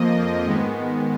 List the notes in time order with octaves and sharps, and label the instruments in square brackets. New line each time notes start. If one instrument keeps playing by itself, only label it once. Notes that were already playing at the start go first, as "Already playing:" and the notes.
Already playing: [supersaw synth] F2 F3 A#3 D#5
G#2 D#3 G#3 B3